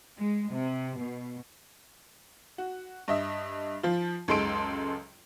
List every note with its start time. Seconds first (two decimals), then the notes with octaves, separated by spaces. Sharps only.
0.18 G#3
0.53 C3
0.98 B2
2.58 F#4
3.08 G2 D#5 E5
3.83 F3 F4
4.28 C#2 F#2 G#3 A4 C6 D7